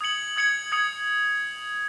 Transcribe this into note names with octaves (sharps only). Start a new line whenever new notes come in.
D#6 G#6 C#7 F#7
D#6 G#6 C#7 F#7
D#6 G#6 C#7 F#7